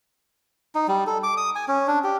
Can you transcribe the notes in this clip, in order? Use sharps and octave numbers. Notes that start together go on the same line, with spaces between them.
D#4
G3
A4
D6
D#6
G#5
C#4
D4
G4